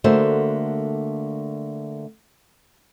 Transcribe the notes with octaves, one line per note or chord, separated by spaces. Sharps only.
D3 A3 A#3 F#4 C5 E5